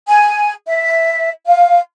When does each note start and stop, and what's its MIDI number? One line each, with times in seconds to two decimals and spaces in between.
0.07 0.52 80
0.67 1.30 76
1.45 1.79 77